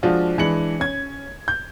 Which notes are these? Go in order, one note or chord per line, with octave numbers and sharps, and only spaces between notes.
F3 G#3 D4 F4 F#4
E3 G#3 D4 C#7 F#7
C#4 G#6
G6